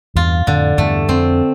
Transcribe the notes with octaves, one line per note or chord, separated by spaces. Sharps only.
E2 G2 F4
F2 A2 D3
E2 G2 A3
F2 C4